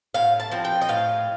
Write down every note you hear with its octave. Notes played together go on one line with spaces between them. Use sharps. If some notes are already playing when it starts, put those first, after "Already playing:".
A2 F5
A5
F3 C4
G5
D#5
A2 F5